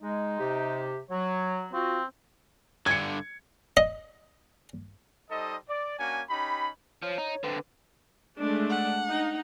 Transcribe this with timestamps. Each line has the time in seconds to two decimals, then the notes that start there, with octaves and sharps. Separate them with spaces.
0.02 G#3 D#4
0.39 C3 G4
1.11 F#3 C#5
1.73 C4 F4 F#4
2.86 G2 D3 G#6 C#7
3.77 D#5
5.30 G3 D#4 A4 C5 D#5
5.69 D5
5.99 A#3 C#4 D4 F#4 C#5 G#5
6.30 C#4 D#4 G4 B5
7.02 F3 C#5
7.18 D#4
7.44 D3 C4 B4
8.39 G#3 A3 D4
8.70 F#5
9.09 D#4